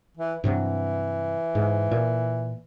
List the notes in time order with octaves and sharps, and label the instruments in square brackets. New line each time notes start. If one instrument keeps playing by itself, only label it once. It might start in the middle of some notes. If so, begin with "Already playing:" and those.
[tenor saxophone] E3
[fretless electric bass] G2 C3 F#3 [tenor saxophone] E3
[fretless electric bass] G#2
A#2